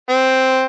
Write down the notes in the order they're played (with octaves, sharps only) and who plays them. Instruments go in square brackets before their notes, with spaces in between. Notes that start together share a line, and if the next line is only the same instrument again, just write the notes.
[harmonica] C4